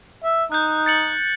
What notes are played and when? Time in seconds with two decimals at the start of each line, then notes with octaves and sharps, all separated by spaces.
0.24 E5
0.52 D#4 F#6 G6
0.86 A6 C#7 F#7